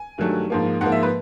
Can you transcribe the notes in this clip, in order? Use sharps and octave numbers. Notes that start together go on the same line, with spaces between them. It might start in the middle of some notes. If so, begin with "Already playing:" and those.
Already playing: G#5
G2 D#3 F#3 A3
G#2 F3 A#3
G#2 F3 A#3 F#5
E5
B4